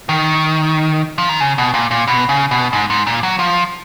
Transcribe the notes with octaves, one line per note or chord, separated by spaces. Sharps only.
D#3
F3
D#3
C#3
B2
A#2
A#2
B2
C#3
B2
G#2
G#2
A#2
F#3
F3